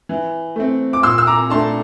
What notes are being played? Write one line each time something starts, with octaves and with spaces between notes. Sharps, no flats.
E3
A3 C4
D6
A#2 C6 E6
E6
A#5 D6
A3 D4 A5 C6